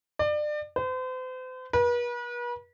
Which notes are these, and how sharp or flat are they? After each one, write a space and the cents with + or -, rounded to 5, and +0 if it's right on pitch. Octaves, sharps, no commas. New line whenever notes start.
D5 +30
C5 -40
B4 -40